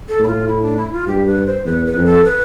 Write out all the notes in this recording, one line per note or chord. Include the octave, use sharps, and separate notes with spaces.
A4
A2 E4
F4
E4
D4
E4
F4
G2 G4
B4
C5
E2 B4
B4
F2
A4
B4